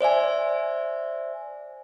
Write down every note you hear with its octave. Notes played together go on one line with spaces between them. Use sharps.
C5 D5 E5 G#5